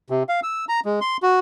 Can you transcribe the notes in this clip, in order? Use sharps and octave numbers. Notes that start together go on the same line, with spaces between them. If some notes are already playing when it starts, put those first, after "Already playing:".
C3
F5
E6
A#5
G#3
C6
F#4